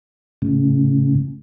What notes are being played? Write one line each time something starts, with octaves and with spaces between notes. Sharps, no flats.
A2 C#3